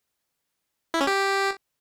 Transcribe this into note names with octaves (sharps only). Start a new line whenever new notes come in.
E4
C#4
G4